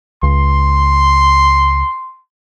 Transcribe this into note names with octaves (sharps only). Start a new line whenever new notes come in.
C#2 C6